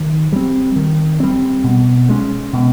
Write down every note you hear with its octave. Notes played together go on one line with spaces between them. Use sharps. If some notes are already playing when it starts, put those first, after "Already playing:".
Already playing: D#3
G3 C4
D#3
G3 C4
B2
G#3 C#4
B2